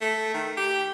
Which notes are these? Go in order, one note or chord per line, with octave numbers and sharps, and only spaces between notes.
A3
D#3
G4